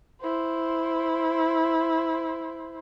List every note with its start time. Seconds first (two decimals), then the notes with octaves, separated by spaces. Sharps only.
0.22 E4 C5